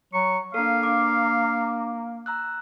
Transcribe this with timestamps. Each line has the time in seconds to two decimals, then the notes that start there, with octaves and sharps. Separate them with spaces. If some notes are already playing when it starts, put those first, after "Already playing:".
0.13 F#3 C#6
0.54 A#3 D4 A4 F5
0.83 D4 D6
2.26 A#5 E6 F#6